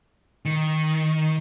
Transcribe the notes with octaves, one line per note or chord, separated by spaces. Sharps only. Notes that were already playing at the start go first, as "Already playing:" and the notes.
D#3